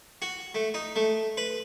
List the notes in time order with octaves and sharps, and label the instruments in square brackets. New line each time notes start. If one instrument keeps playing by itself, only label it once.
[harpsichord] F#4
A3
D#4
A3
B4